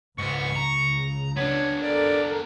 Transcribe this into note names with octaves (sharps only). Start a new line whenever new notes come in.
C#2 G#2 C#3 B3 C#6
A#5
B3 D4 C#5
A4 A#4 D5